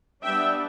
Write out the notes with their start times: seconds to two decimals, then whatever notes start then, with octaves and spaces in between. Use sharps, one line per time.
0.22 G3 B3 D4 E5 G5